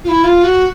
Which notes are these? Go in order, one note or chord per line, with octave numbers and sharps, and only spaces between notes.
F4
E4
F4
F#4